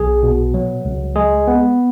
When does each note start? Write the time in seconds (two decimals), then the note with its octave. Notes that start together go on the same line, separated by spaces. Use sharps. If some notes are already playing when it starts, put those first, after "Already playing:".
Already playing: B1 G#4
0.23 B2
0.54 F#3
0.85 C#2
1.16 G#3 G#4
1.48 B3